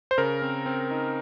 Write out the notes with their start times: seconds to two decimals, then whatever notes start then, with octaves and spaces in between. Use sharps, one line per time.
0.11 C5
0.18 C#3 A#4
0.42 C4
0.66 C4
0.91 D#4